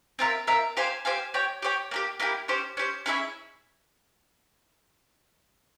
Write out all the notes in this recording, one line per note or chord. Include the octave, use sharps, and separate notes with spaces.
C4 F4 A#4 E5
C4 F4 A#4 E5
G4 C5 F5 G#5
G4 C5 F5 G#5
G4 C#5 G5
G4 C#5 G5
A#3 E4 G4
A#3 E4 G4
C#4 G4 C5
C#4 G4 C5
C#4 E4 G#4 E5